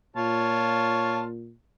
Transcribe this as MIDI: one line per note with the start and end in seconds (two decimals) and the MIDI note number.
0.16 1.53 46
0.16 1.22 65
0.16 1.22 73
0.16 1.22 81